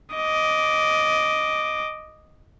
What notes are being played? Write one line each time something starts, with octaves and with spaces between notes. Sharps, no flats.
D#5 D6